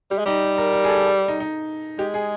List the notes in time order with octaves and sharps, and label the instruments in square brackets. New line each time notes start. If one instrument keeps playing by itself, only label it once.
[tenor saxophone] G3 [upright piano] G4
[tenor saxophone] G#3
[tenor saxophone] G3 [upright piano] D#4
[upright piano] A#4
A#4
G#4
A4
A4
D#4
D#4
[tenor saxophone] G#3 [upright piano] G4
[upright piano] G#4